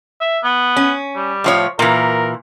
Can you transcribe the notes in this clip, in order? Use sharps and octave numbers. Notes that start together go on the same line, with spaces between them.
E5
B3
C#4
G3
A2 F3 C#5
A#2 E3 A#4